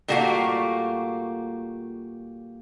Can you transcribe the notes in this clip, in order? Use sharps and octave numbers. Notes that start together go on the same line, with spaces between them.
A#2 G3 A3 A#3 F#4 F5